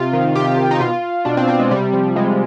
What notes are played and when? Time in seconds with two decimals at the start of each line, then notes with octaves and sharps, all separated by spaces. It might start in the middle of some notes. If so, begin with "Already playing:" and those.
Already playing: C3 F4
0.13 D#3
0.35 C3 G4
0.58 D#3
0.71 D#4
0.80 B2 F4
1.25 B2 D4
1.37 C4
1.49 C4
1.59 G#3
1.71 C3 G3
1.93 F3
2.16 C3 G#3